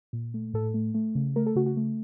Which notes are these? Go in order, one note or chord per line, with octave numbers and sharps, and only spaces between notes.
A#2
A3
A2 A4
A3
A3
C#3
A3 A#4
A4
C#3 F#4
F#4
A3